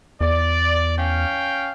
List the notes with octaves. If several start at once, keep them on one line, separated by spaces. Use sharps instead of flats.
E2 D5
C#4 F5 G5